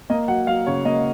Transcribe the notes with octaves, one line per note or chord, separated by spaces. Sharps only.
A#3 D#5
F#3 F#5
F#3 F5
C#3 C#5
A#3 D#5